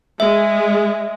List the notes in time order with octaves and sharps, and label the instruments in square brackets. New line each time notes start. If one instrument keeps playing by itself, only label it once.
[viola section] G#3 [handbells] E5